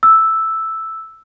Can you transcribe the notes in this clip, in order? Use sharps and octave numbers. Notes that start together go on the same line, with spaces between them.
E6